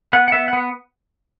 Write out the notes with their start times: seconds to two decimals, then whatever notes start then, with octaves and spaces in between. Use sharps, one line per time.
0.13 B3 F#5
0.28 F#5
0.32 B3 E5
0.48 F#5
0.53 B3